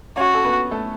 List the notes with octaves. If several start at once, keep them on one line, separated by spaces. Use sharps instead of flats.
C#4 F#4 C#5
A4
B3 B4
A3 A4